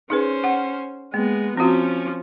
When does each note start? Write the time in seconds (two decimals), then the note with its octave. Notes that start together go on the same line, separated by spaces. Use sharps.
0.10 C#4 D#4 G#4 B4 C5
0.44 F#5
1.14 G#3 A#3 B3
1.57 F3 C4 C#4 F#4